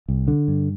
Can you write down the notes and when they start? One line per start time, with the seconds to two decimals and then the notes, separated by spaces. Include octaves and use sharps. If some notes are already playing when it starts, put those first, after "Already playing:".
0.08 C2
0.28 D3
0.48 G2